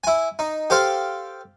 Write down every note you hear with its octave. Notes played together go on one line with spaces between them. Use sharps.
E4 G#5
D#4
G4 A4 C5 F5